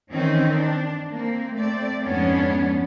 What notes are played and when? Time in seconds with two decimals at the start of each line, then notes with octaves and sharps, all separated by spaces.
0.12 D#3 E3 C4 C#4 D#4
0.56 D4
1.12 A#3 C4
1.54 A3 C4 D5
2.04 F2 G#2 B3 C#4 D4